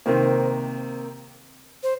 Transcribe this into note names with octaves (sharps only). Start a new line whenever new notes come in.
C3 D#3 A#3 C5
C5